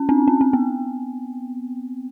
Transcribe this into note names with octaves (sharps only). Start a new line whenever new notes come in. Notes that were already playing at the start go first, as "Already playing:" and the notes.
Already playing: C#4
C4 D4
C#4
C4
B3